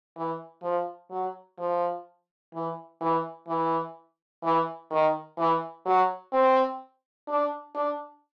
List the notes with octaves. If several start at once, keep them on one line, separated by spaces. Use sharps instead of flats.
E3
F3
F#3
F3
E3
E3
E3
E3
D#3
E3
F#3
C4
D4
D4